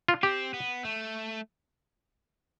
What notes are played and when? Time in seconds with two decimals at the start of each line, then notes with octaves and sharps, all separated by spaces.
0.09 F4
0.23 C4 G4
0.54 B3
0.85 A3